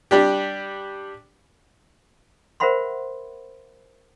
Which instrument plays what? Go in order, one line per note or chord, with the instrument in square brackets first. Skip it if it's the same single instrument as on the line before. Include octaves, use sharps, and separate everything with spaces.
[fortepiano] G3 D4 G4
[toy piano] A#4 C5 E5 F#5 B5 C6